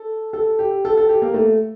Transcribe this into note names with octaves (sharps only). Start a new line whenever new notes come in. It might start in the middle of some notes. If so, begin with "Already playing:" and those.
Already playing: A4
A4
G4
A4
A4
G4
A#3
A3